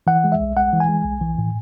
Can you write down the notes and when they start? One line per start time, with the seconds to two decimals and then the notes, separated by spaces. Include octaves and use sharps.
0.07 E3 F#5
0.24 G#3
0.32 E5
0.40 B1
0.56 G#3 F#5
0.73 E3
0.80 G#5
0.89 G#3
1.05 B1
1.21 E3
1.39 A2